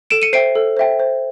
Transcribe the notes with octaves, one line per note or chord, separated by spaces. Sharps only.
A4 D7 E7
C#7 D#7
C5 E5 G5 C7 D7
A4
C5 E5 G5
C5